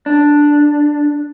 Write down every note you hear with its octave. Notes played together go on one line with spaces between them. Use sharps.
D4